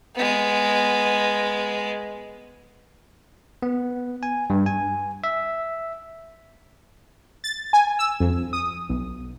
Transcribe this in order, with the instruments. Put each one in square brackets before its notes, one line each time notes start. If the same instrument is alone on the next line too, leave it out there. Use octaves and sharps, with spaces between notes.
[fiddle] G#3 B3
[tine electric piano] B3
G#5
G2
G#5
E5
[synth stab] A6
G#5
E6
F2
D#6
B1